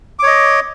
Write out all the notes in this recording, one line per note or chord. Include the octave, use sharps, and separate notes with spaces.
C#5 D#5 D6